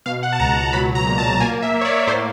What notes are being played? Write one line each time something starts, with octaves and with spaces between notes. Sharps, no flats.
B2 F5
F#5
A5
C#2 A#5
F#3 B5
A#5
A#2
A5
A#3 G#5
E5
A#3
C#5
D5
A2 C5